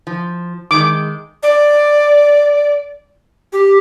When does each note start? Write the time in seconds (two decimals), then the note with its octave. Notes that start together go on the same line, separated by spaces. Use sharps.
0.07 F3
0.71 D#3 G#3 D6
1.43 D5
3.53 G4